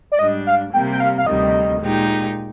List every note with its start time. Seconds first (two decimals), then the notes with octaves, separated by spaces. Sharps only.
0.12 D5
0.19 G#2 G3 D4 D#5
0.47 F5
0.73 C3 G3 A#3 G5
0.92 G5
1.00 F5
1.18 F5
1.27 D2 C3 D#3 G3 D#5
1.81 A#2 G#3 D#4 G4